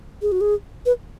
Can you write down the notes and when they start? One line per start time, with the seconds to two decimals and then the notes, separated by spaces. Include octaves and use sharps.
0.22 G#4
0.32 F#4
0.41 G#4
0.86 B4